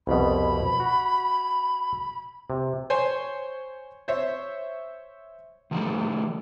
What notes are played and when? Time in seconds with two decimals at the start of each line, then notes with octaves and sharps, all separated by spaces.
0.07 C2 F2 B2 B5
0.80 F#4
2.50 C3
2.90 C5 C#5 G#5 C6
4.08 C5 C#5 E5
5.71 D#3 F3 G3 A3 E4